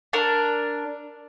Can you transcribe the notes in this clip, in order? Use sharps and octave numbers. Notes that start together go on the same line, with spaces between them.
D4 A#4